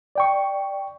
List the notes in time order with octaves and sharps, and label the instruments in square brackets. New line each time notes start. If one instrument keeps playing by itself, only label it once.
[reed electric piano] D5 G5 C#6